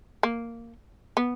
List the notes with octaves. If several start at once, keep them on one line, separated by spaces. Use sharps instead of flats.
A#3
B3